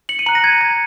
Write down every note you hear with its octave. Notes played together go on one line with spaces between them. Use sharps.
C#7 F#7
D#7
A#5 F#6 C#7 F#7
A#6 D#7
G#6 C#7
G#6